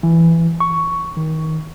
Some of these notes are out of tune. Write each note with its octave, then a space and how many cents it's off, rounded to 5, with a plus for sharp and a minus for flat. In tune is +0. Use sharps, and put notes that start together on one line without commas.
E3 +10
C#6 +5
D#3 +25